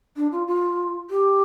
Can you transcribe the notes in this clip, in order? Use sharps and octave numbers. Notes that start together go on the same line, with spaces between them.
D4
F4
F4
G4